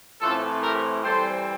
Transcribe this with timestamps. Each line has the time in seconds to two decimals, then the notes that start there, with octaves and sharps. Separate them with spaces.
0.21 A2 E3 A3 C4 F4 A4
0.62 G4 A#4
1.03 E3 G3 C4 A4 C5